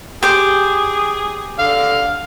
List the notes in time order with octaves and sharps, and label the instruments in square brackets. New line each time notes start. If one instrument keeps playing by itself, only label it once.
[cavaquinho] G4 C5 [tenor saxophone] G#4
[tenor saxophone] D3 [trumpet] F5